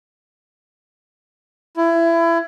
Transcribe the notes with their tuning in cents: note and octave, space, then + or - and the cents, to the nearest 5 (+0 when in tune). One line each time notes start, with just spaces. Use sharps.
E4 +25